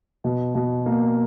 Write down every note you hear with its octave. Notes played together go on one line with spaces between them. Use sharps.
B2
B2
A#3